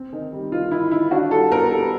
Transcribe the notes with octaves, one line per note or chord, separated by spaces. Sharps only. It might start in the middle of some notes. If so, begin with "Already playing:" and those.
Already playing: C4
D#3
G3
D#3 F4
D#3 E4
D#3 E4
D4 F#4
G3 A4
B3 A#4
G3 A4